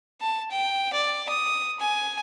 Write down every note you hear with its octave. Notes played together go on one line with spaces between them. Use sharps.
A5
G5
D5
D#6
G#5